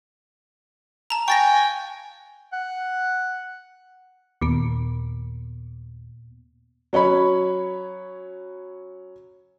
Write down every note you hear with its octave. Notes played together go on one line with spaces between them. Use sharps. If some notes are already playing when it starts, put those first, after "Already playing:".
A5 A#5
G5 G#5 C#6 A6 A#6
F#5
D#2 A#2 A#3 B3
F#3 C#4 C#5 B5